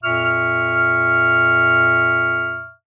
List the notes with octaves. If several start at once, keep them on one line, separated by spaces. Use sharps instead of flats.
F2 A#2 E5 C#6 F6